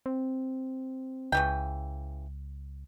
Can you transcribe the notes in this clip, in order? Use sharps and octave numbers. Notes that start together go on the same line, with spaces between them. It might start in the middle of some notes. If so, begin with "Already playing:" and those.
C4
C#2 C#3 E3 G5